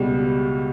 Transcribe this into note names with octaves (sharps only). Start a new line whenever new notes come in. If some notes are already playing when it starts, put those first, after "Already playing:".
Already playing: C#2 B2 G3